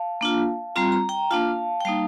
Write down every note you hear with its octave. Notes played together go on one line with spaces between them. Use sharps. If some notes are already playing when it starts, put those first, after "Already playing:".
Already playing: F5 A5
A#3 D4 F4
G3 C4 F4 A#5
A#5
G5 A#5
A#3 D4 F4 F5 A5
G5
G3 A#3 D#4 F5 A5